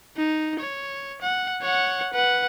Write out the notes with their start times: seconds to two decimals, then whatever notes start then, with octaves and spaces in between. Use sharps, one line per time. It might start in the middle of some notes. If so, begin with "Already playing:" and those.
0.17 D#4
0.60 C#5
1.22 F#5
1.62 C#5 F#5
2.13 B4 F#5